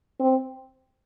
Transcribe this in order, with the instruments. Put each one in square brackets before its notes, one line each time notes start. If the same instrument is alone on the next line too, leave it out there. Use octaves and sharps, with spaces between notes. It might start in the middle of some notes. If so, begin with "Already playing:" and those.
[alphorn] C4